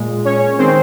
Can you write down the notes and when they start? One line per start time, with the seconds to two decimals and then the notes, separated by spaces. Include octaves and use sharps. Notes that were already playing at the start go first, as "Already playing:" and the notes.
Already playing: A#2 G#3
0.25 C#4 C#5
0.58 D#3 G#3 C4 C5